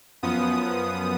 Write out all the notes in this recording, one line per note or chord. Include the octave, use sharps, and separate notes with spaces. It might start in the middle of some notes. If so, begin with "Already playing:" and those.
F#2 F3 B3 D#6